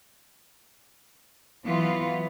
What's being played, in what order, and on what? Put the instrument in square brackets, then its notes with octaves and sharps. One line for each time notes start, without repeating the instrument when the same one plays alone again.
[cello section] E3 F#3 B3 F4